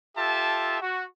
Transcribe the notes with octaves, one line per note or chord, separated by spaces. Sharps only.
F4 G4 A4 E5 A5
F#4